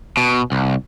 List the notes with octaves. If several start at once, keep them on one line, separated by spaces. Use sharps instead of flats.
B2
C2